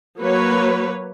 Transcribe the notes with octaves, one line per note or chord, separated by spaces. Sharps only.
F#3 A#3 B4 C#5